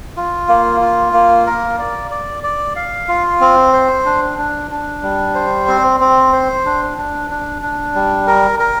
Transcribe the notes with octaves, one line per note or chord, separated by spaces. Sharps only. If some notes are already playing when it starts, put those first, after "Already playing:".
F4
A#3
F4
A#3
A#4
D5
D5
D5
F5
F4
C4
C5
D4
D4
D4
G3
C5
C4
C4
C5
D4
D4
D4
D4
G3
A#4
A#4